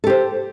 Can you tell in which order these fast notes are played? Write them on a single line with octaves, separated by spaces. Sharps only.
A4 G4 C5